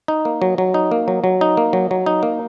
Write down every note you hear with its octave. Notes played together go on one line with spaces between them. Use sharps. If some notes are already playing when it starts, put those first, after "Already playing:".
D#4
A#3
F#3
F#3
D#4
A#3
F#3
F#3
D#4
A#3
F#3
F#3
D#4
A#3